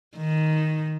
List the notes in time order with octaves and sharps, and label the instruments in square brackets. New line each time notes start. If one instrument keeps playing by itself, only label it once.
[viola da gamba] D#3